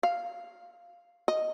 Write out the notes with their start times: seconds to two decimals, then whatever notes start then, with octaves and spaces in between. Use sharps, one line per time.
0.03 F5
1.28 D#5